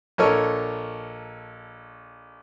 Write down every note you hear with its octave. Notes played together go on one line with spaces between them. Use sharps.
A#1 A4 A#4 C#5 D#5 C#6